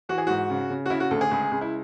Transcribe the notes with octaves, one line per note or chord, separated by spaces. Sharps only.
E3 F#4
G#4
G#2 F#4
C#3
C#3
F#4
C#3 E4
F#4
D2 A4
G#4
C#2
C#2
E4